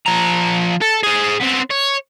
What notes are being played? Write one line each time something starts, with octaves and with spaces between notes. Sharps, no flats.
F3 A#5
A4
G#4 C5
B3 C4
C#5